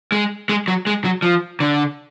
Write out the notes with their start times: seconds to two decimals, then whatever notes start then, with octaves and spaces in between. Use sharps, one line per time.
0.12 G#3
0.49 G#3
0.68 F#3
0.87 G#3
1.05 F#3
1.22 F3
1.60 D3